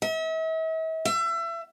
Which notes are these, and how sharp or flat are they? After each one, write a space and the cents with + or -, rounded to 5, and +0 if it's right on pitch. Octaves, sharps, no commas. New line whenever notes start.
E5 -45
E5 +30